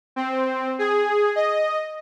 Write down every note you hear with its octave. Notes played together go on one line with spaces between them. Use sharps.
C4
G#4
D#5